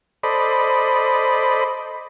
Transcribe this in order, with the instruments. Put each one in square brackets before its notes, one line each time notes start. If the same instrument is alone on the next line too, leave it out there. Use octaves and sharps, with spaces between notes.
[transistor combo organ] A4 C5 D5 D#5 B5